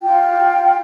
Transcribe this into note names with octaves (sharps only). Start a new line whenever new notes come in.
F4 G5